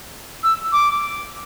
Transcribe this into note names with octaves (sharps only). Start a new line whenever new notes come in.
E6
D6